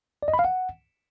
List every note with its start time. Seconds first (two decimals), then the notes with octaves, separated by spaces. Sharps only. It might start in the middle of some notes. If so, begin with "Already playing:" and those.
0.23 D5
0.28 D#5
0.34 B5
0.39 F5
0.45 F#5